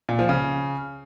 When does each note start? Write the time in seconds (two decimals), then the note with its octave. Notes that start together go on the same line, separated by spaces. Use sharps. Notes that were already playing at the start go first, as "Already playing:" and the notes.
0.09 A#2
0.19 F3
0.29 C#3